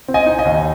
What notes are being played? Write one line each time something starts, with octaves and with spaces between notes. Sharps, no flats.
C4
D#5 G#5
D#4
D#5 G#5
D#2